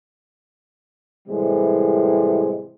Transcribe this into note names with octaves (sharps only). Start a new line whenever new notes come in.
A2 C3 E3 G3 G#3